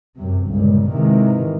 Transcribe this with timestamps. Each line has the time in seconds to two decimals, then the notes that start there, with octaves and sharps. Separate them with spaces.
0.16 F#2 C3
0.49 G1 C#2 A#2
0.91 G#2 C3 D#3 E3